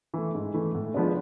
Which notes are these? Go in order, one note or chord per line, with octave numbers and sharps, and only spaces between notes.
E3 A3
G#2
E3 A3
A2
F3 G#3 B3 D4